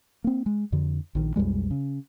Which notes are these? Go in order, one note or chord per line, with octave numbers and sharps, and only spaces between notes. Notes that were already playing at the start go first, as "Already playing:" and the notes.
A#3 C4
G#3
F2 D3
A#1 D#3
B1 F2 G3 G#3
C#3